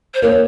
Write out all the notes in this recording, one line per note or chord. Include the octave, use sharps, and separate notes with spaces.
C5
A#3 C#5